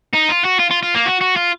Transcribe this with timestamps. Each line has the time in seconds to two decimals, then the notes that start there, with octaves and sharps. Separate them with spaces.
0.14 D#4
0.30 F4
0.45 F#4
0.60 F4
0.71 F4
0.83 F4
0.95 A#3
1.06 F#4
1.21 F#4
1.37 F4